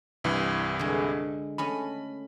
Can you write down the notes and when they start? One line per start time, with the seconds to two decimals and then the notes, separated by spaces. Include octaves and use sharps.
0.24 C2 G2 E3
0.79 D3 G#3
1.58 A3 C#4 D#5 B5